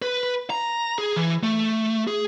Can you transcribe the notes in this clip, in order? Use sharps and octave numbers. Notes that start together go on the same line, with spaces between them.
B4
A#5
G#4
E3
A3
G#4